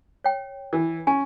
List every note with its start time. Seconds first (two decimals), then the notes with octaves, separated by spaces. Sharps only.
0.24 C#5 G5
0.73 E3
1.07 C#4 G#5